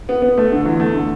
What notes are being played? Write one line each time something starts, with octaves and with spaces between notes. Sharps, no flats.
B3
B3
A3
D3
E2
A3
D3